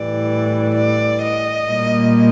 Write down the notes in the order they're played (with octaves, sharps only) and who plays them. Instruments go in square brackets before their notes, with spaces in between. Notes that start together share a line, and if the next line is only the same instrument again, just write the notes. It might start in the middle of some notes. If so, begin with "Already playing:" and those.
Already playing: [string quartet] A2 E3 G3 D5
D5
D#5
A#2 G3 A#3